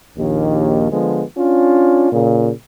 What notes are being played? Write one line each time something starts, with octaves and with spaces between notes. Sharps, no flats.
A#1 D#2
D3 F3 G#3 B3
C#4 D4 F4
A#2 C#3